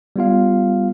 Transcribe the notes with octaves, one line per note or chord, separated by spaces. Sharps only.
G3 B3 F4 F5